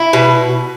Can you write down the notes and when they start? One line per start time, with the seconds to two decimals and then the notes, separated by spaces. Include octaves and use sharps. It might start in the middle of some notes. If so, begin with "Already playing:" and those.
Already playing: E4
0.13 B2